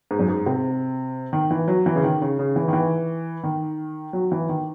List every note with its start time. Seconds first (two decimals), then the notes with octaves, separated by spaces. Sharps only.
0.11 G#2
0.19 F#2
0.29 G#2
0.46 C3
1.33 D#3
1.51 E3
1.68 F#3
1.86 E3
1.95 C#3
2.04 D#3
2.21 C#3
2.39 C#3
2.56 E3
2.68 D#3
2.73 E3
3.44 D#3
4.13 F#3
4.32 E3
4.49 D#3